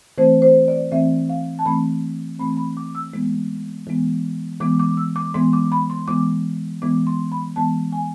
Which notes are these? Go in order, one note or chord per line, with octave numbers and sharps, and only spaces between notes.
E3 A3 C4 C5
C5
D5
E3 A3 C4 E5
F5
A5
E3 A3 C4 B5
E3 A3 C4 B5
B5
D6
E6
E3 G#3 B3
E3 G#3 B3
E3 G#3 B3 D6
D6
E6
D6
E3 G#3 B3 C6
D6
B5
C6
E3 G#3 B3 D6
E3 G#3 B3 D6
C6
B5
E3 G#3 B3 A5
G#5